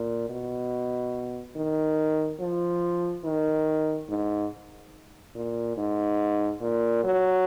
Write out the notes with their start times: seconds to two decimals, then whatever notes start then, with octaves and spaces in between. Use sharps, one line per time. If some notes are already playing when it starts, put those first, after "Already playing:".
Already playing: A#2
0.30 B2
1.56 D#3
2.40 F3
3.25 D#3
4.09 G#2
5.35 A#2
5.77 G#2
6.61 A#2
7.04 F#3